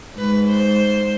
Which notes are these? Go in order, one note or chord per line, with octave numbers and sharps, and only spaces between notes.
G#2 B4
C5